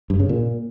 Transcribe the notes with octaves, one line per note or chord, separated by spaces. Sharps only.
G2
C#3
A#2